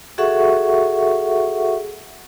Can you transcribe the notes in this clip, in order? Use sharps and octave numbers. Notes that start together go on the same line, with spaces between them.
F#4 G#4 A4 E5 F#5 C#6